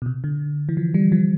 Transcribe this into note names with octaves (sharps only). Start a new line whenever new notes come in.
B2
C3
D3
E3
F3
G3
F3